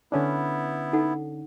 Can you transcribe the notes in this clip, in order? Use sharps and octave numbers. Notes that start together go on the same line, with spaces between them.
D3 B3 C#4 D4 E4
D#4 A4 F#5